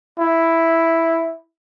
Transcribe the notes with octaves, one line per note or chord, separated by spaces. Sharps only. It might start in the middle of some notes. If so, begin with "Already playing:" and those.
E4